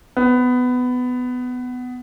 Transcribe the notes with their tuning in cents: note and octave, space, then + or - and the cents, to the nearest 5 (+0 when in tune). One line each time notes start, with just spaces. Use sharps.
B3 +15